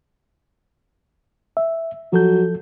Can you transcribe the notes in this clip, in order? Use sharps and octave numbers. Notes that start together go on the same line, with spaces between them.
E5
F3 F#3 A4 G6